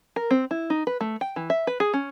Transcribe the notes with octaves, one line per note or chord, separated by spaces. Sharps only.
A#4
C4
E4
D#4
B4
A3
G5
E3
E5
B4
G#4
C#4